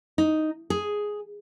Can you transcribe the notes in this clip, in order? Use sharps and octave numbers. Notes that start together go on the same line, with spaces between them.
D#4
G#4